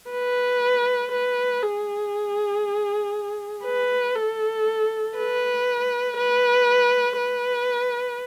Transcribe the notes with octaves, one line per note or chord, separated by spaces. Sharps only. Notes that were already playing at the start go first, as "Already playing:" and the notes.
B4
B4
G#4
B4
A4
B4
B4
B4